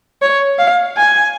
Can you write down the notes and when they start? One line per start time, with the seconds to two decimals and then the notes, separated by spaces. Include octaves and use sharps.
0.22 C#5
0.59 F5
0.97 G#5